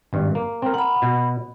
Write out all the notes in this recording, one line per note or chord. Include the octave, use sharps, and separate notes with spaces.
G#1 G2
A#3
C4 A#4
A#4 F#5 B5
B2